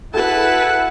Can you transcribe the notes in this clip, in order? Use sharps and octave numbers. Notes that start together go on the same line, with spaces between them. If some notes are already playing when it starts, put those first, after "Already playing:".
E4 F#4 G#4 A4 B4 F#5 A5